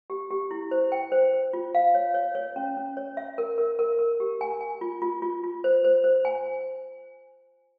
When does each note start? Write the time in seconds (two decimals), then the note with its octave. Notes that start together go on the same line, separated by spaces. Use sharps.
0.10 G4
0.31 G4
0.51 E4
0.71 C5
0.92 G5
1.12 C5
1.33 C5
1.53 F4
1.75 F5
1.94 C#5
2.14 C#5
2.35 C#5
2.56 C#4
2.77 C#4
2.97 C#5
3.17 E5
3.38 A#4
3.58 A#4
3.79 A#4
3.99 A#4
4.20 G4
4.41 G#5
4.61 G#5
4.81 F4
5.02 F4
5.22 F4
5.44 F4
5.64 C5
5.84 C5
6.04 C5
6.25 G#5